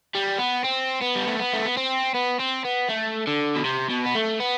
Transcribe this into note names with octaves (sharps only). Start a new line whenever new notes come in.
G3
B3
C4
B3
G3
A3
B3
A3
B3
C4
B3
C4
B3
A3
D3
B2
C3
B2
B3
A3
B3